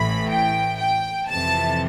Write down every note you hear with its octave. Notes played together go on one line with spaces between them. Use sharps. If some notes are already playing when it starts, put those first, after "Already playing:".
Already playing: A1 A2 E3 B5
G5
G5
F2 C3 E3 A5